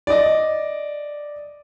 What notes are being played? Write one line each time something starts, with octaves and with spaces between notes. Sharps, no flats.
D5 D#5